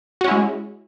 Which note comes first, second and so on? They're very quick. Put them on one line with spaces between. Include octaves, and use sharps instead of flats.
F#4 C#4 E4 G#3